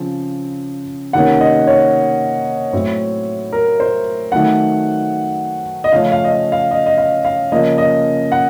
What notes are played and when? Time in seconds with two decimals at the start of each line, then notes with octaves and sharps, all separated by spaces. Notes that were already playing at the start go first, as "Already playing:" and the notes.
Already playing: C#3 F3 C4
1.13 C3 D#3 A#3 C#4 F#5
1.41 D#5
1.67 C#5
2.73 A2 F#3 C4
3.53 A#4
3.80 C5
4.32 D#3 F#3 A3 C4 F#5
5.84 D#5
5.92 C#3 F3 A3 C#4 F5
6.12 F5
6.24 D#5
6.31 F5
6.52 F5
6.71 D#5
6.86 D#5
6.98 F5
7.25 F5
7.52 C#3 F3 A#3 C#4 D#5
7.78 D#5
8.32 F#5